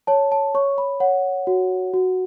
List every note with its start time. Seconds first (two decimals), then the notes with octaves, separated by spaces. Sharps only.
0.07 C#5 A5
0.32 A5
0.54 C#5 C#6
0.78 B5
1.00 C#5 F#5
1.47 F#4
1.94 F#4